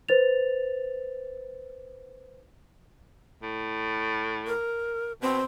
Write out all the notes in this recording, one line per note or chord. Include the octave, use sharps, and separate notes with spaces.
B4 C5 A6 F7
A2
A#4
B2 C4